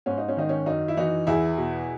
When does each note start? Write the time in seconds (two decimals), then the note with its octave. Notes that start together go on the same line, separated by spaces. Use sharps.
0.06 G#2 C#4
0.18 D#4
0.28 C#4
0.37 D#3 D#4
0.49 C#4
0.66 F#2 D#4
0.88 E4
0.97 E3 D#4 F#4
1.27 E2 E4 G#4
1.58 B2